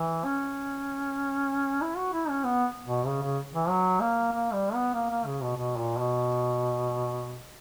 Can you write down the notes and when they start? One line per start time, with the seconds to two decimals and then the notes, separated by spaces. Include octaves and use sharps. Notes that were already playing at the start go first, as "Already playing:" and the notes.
Already playing: E3
0.24 C#4
1.81 E4
1.97 F#4
2.13 E4
2.29 C#4
2.44 B3
2.86 B2
3.06 C#3
3.22 C#3
3.53 E3
3.69 F#3
4.00 A#3
4.32 A#3
4.53 G3
4.74 B3
4.94 A#3
5.10 A#3
5.26 C#3
5.42 B2
5.57 B2
5.78 A#2
5.99 B2